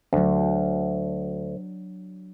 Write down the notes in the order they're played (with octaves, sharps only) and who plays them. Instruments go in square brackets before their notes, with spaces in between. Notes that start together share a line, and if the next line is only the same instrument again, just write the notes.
[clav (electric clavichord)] D2 [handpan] F#3 D4